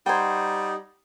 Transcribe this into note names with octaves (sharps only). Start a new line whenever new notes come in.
G3 D#4 C5 F#5 G5 A#5 G#6